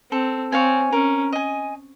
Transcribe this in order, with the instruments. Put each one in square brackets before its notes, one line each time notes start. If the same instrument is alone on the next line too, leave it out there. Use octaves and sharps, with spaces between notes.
[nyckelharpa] C4 [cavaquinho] A4
[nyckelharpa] C4 [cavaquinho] C#5 F5 G#5
[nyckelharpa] C#4 [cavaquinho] A#4
[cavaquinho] D#5 G#5